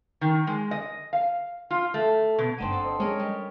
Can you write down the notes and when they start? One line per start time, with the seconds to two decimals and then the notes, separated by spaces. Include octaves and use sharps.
0.21 D#3
0.47 G#3
0.71 D#5
1.13 F5
1.71 F4
1.94 A3
2.38 B2
2.58 G1 A3 C4 D4 D#4 F#5 D#7
2.73 A4
2.85 C5 D#5
3.00 G#3 C#4 G#4 A#4 D#5
3.19 G3